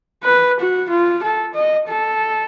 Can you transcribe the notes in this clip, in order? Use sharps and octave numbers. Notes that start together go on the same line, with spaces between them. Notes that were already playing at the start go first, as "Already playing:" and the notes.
B4
F#4
F4
A4
D#5
A4